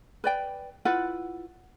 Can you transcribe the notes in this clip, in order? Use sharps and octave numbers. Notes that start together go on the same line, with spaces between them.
B4 D5 G5
E4 F4 B4 F#5